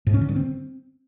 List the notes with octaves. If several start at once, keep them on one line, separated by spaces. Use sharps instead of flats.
G#2
C#4
D3
G2
C4